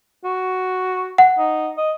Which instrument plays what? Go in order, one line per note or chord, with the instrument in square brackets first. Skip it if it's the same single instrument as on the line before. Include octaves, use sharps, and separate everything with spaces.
[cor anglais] F#4
[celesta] F#5
[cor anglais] D#4
D#5